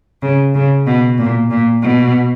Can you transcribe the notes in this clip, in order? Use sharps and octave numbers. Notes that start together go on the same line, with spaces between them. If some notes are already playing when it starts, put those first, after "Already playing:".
C#3
C#3
B2
A#2
A#2
B2